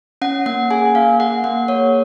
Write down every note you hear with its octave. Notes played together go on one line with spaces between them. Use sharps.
C#4 F#5
A#3 F#5
G#4 G#5
A#3 F5
G#4 F#5
A#3 F#5
A#3 C#5